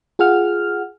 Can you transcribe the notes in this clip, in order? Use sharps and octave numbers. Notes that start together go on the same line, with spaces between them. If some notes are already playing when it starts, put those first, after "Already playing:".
F4 G#4 F#5 F6